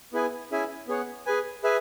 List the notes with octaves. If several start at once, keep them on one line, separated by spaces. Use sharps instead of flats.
B3 E4 G#4 B4 G#5
C#4 E4 G#4 E5 G#5
B3 G#4 C#5 F#5
G#4 B4 G#5
G#4 B4 E5 G#5